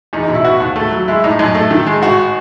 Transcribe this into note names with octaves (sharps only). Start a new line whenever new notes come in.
E2 D#4
D#4
B2
E4
B3 F#4
D#2
A3
F#3
G#3 E4
A2 D#4
F#2 D#4
A3
D#3
G#3
G#1 F#4